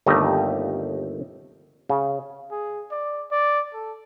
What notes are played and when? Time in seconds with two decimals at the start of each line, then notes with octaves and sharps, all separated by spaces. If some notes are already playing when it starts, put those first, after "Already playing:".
0.06 G1 D#2 G3 A3 D#4 D#5
1.89 C#3
2.51 G#4
2.92 D5
3.31 D5
3.74 A4